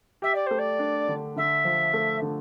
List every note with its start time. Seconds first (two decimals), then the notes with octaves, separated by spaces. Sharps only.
0.22 G4 E5
0.34 D5
0.46 A3 C5
0.58 D5
0.79 D4
1.08 D3
1.36 D3 E5
1.65 F3
1.94 A3
2.22 D3